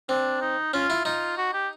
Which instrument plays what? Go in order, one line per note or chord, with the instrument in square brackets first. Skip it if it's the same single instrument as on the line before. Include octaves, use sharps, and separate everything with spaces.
[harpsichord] C4 [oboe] D4
[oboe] D#4
[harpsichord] C#4 [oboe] F4
[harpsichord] E4
[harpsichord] D#4 [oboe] F4
[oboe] F#4
G4